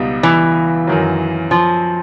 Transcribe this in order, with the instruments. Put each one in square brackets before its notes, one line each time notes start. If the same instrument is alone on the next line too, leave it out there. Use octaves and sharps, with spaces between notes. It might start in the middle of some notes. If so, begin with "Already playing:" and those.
Already playing: [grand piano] C#2 B2 G3 B3 D#4
[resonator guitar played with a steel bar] E3
[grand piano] F#2 D#3 F#3
[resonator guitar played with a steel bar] F3